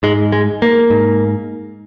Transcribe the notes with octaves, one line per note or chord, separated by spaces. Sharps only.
G#2 G#3
G#3
A#3
G#2